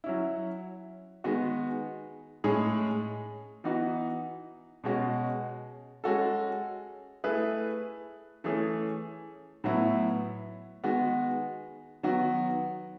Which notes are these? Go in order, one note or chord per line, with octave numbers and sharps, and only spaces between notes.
F#3 C#4 E4
D#3 G#3 B3 F#4
A2 G#3 C#4 G#4
E3 B3 D#4 F#4
B2 G#3 C#4 F#4
G#3 C#4 F#4 A4
A3 E4 G#4 B4
E3 A3 C#4 G#4
A2 F#3 B3 E4
D#3 G#3 B3 F#4
D#3 F#3 B3 F#4